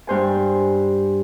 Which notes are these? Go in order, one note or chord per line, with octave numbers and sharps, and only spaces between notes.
G2 C5 G#5